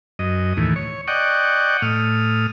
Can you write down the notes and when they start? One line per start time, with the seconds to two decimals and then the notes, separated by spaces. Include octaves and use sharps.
0.19 F#2 D#5
0.57 D#2 A2 E3
0.76 C#5
1.08 D5 D#5 F#5 G5 C#6
1.82 A2 D#6 F6